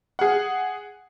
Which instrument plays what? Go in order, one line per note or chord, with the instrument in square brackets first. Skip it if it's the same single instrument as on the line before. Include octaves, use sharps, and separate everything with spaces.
[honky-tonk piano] G#4 F#5